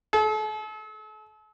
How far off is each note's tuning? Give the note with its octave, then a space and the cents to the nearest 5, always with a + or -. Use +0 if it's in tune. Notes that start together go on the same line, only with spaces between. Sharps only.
A4 -40